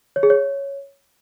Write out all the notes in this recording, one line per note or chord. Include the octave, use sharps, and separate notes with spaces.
C#5
G#4
C#5